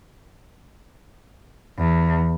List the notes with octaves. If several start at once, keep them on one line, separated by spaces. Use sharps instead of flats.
E2